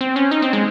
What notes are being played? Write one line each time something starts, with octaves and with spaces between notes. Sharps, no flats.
C4
C#4
D#4
C4
G#3